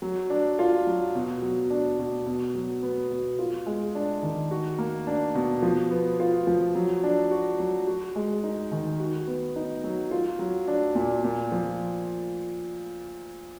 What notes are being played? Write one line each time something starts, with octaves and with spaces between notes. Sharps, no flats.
F#3
D4
F4
F#3
B2
F#3
D4
B2
B2
F#3
B3
B2
F4
G#3
D4
D#3
F#4
A#3
D4
B2
F3
B3
F4
F3
F#3
D4
F#4
F#3
F#4
G#3
D#4
D#3
F#4
B3
D#4
F#3
F4
F#3
D4
A#2
A#2
F3